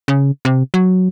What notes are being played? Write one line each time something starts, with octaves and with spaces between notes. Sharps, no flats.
C#3
C3
F#3